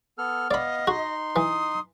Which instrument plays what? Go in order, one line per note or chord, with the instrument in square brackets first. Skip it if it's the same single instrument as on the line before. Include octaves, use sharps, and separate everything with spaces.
[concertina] B3 A4 F6
[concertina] B3 F5 [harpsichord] D5 B5 [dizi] D#5
[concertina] D#4 C6 [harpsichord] F#4
[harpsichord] E3 [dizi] D#6